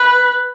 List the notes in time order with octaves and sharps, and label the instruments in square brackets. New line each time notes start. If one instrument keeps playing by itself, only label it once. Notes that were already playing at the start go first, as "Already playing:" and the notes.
Already playing: [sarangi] B4